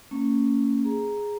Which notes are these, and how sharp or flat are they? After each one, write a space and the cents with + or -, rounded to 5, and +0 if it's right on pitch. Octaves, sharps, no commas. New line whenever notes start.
A#3 -35 C#4 +0
G#4 +0 A#5 +0